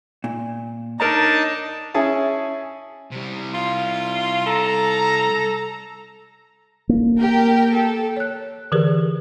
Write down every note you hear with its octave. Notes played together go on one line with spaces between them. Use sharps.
A#2
D4 D#4 A#4 C#5 A5 A#5
C#4 E4 G#4 A5
C3 G3
F4
A4 A#5
A#3
G4 A#4 G5
A4
C#5 F#6
D3 E3 G4 G#4 A#4 B4